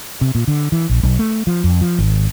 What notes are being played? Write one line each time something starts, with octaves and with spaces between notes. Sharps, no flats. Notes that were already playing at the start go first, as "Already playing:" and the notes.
C3
A#2
D3
E3
A#1
B1
A3
F3
F2
F3
G#1